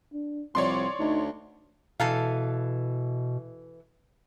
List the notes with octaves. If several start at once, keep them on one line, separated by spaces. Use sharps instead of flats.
D4
C2 F3 C#5 D5 C6
D2 D#4
B2 E3 A4 F5